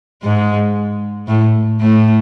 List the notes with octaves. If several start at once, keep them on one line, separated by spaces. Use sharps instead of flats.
G#2 G#3
A2 A3
A2 A3